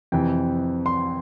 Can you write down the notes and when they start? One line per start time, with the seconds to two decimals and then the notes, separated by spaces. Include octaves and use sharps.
0.12 F2 C3 E3 G5
0.86 C6